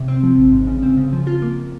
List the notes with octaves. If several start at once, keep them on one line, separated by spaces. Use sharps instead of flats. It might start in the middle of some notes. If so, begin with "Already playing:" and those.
Already playing: C3
C4
F3
G#1
G#2
C#3
C4
C#3
F3
F4
A#3